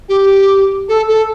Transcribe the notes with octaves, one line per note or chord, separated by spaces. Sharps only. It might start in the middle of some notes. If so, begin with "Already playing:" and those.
G4
A4
A4